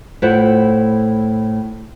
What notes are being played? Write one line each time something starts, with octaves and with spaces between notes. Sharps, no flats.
A2 E4 F4 C5 F#5